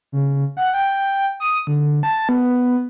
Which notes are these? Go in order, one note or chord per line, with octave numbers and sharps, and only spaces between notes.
C#3
F#5
G5
D#6
D3
A5
B3